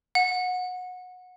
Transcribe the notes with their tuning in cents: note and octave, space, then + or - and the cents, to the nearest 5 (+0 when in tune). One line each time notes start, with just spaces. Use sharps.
F#5 -20